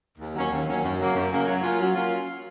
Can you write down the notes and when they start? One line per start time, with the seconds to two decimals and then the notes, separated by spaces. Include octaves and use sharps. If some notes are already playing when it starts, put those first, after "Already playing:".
0.18 D#2
0.35 D#3 F#3 A#3 C#4
0.51 D#2
0.67 D#3 F#3 A#3 C#4
0.83 F#2
0.99 C#3 F#3 A#3
1.15 F#2
1.31 C#3 F#3 A#3
1.47 F#3
1.63 A#3 C#4 F4
1.80 F#3
1.95 A#3 C#4 F4